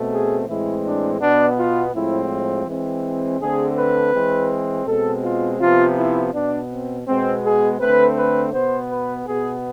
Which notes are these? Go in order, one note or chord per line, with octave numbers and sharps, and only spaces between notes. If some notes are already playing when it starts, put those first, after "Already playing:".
Already playing: B2 A3 C4
G#4
A2 E3 G#3 C4 E4
D4
B2 B3 D4
F4
A2 F3 G#3 C4 E4
E3 G#3 C4
D3 A3 C4 G#4
B4
E3 G#3 C4
B2 G#3 C4 A4
F4
C3 F3 B3 F4
E4
B2 B3 D4
C4
B2 G#3 B3 C4
G#4
D3 A3 C4 B4
B4
B2 B3 C5
B4
B2 B3 G#4